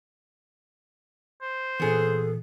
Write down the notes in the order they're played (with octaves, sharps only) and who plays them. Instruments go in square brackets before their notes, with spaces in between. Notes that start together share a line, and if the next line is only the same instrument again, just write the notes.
[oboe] C5
[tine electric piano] A#2 E3 [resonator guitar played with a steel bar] B3 G#4 [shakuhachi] A4